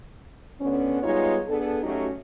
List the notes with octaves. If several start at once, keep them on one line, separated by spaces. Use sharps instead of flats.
D2 D3 B3 C#4
G3 G#3 B3 D#4 F4 C#5
B3 D4 G#4 A4
F#3 A3 C#4 D#4 F#4 G4